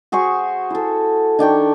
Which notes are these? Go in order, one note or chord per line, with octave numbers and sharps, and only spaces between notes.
F#4 G#4 C5 C#6
E4 A4
D#3 D4 G5 C#6